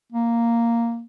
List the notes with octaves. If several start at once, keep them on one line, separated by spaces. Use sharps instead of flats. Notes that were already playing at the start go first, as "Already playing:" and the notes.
A#3